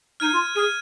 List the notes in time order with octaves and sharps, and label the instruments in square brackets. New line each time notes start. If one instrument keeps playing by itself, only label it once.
[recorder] D#4 [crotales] F6 G#6 D#7
[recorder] F4
[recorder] G#4 [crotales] F6 G#6 D#7